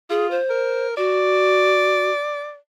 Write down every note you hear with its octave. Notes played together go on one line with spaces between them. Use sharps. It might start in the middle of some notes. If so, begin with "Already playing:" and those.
F4 G#4
C5
A#4
F#4 D5